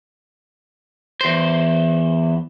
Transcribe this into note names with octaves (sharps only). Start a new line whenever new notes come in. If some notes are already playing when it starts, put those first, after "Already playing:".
E2 C5